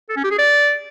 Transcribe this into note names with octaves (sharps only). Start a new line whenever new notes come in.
A4
C#4
G4
G#4
D5